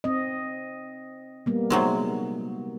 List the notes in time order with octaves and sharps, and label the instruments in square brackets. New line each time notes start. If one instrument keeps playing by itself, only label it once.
[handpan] C4 D#5
G3 A#3 B3
[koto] C3 F#3 G#3 [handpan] D#4 F#4